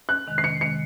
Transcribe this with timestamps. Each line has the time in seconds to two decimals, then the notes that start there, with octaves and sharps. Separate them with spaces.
0.09 F#6
0.26 F2 C3 D#3 G#3
0.38 C7
0.44 C#7
0.61 C3 D#3 G#3 C#7